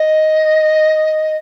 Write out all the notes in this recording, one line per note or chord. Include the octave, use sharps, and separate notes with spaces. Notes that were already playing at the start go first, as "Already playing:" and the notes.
Already playing: D#5